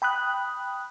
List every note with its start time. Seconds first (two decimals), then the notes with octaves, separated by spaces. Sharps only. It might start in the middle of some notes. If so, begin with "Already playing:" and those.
0.02 G5 B5 D#6 F#6